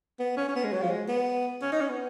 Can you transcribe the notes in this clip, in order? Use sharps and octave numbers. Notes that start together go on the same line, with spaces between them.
B3
C#4
C#4
B3
G#3
F#3
F3
G#3
B3
C#4
D#4
C#4
B3